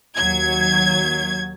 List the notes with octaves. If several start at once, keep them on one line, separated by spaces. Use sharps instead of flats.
D#2 F#3 G#6